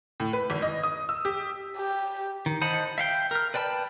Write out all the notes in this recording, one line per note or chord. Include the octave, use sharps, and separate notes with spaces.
A2
B4
G#1
D#5
D#6
E6
G4
G4
D#3
C5 D#5 F#5 A5 B5
E5 F5 G5
A#4 F6
B4 D5 G5 A5 B5